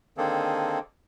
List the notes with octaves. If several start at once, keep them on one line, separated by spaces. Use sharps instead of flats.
D3 D#3 A#3 C4 G#4 A4